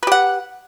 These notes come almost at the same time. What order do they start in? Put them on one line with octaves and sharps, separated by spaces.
B4 G4 F#5